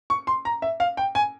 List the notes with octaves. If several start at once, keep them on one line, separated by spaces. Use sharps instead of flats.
C#6
C6
A#5
E5
F5
G5
G#5